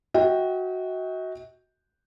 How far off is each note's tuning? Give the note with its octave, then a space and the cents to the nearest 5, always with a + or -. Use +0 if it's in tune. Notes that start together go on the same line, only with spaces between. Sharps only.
F#4 +0 D#5 +45 G5 +0